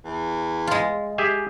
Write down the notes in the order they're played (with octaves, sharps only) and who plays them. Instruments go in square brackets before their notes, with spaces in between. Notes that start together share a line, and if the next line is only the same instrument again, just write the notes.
[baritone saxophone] E2
[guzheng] G#3 F4
[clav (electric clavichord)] G4 G#4 E5